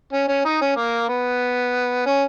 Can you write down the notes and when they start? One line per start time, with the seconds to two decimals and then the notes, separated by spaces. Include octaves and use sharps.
0.13 C#4
0.28 C#4
0.45 D#4
0.61 C#4
0.76 A#3
1.09 B3
2.06 C#4